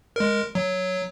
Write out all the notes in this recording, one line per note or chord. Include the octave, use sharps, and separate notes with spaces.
G#3 A#4
F#3